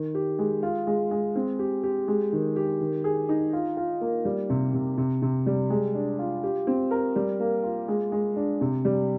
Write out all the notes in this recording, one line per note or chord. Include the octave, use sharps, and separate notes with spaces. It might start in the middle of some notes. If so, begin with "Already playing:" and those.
Already playing: D#3
G4
G#3
F4
G#3
G#3
C4
G4
G4
G#3
D#3
G4
D#3
G#4
D#4
F4
F4
A#3
G3
C3
C3
C3
C3
G3
G#3
D4
F4
G4
C4
A#4
G3
A#3
F4
G#3
G#3
D4
C3
G3